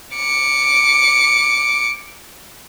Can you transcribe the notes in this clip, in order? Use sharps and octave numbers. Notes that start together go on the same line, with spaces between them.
D6 C#7